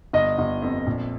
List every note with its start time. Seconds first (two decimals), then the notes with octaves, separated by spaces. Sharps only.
0.13 G1 D#5
0.38 G1
0.62 F2
0.87 A#1